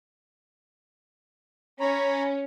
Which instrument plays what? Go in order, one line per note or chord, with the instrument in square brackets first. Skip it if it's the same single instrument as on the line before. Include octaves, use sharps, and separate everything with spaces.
[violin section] C#4 [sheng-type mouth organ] C#5 A#5 B5